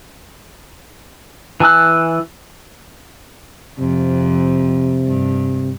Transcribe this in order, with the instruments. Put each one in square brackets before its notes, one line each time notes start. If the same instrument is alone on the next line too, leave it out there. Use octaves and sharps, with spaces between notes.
[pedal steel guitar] E3 G#5 A5 E6 F#6
[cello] F2 [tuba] C3
[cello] G2